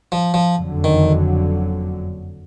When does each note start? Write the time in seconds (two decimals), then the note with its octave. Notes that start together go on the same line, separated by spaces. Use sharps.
0.12 F3
0.34 F3
0.55 F#1 F2 D3 F#3
0.84 D#3